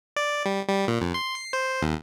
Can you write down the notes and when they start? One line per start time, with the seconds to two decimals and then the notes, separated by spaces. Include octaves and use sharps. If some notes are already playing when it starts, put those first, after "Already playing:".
0.16 D5
0.46 G3
0.69 G3
0.88 A#2
1.01 F2
1.14 C6
1.35 C7
1.53 C5
1.82 D#2